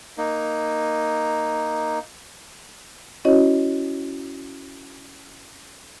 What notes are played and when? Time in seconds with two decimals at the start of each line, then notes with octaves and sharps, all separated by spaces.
0.18 A#3 D#4
3.25 C#4 E4 F#4 C#5 D#5